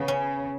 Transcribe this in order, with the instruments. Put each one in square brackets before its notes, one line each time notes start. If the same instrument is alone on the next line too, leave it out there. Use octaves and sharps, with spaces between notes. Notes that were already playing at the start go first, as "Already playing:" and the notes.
Already playing: [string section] C#3 [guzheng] B3
[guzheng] C#4